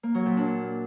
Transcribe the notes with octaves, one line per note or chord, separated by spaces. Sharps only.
A#3
F#3
A#2
D4